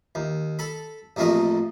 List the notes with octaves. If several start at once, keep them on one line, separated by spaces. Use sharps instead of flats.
D#2
A4 B5
A1 F2 A3 A#3 D#5